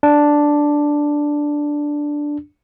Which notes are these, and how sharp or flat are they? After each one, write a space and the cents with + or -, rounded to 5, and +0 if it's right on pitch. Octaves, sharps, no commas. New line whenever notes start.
D4 +0